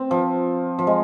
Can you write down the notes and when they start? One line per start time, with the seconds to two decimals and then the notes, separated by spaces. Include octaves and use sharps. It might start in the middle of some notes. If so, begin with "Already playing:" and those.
Already playing: C4
0.11 F3
0.79 F3
0.87 G#3